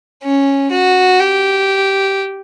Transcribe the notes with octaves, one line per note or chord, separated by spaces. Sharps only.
C#4
F#4
G4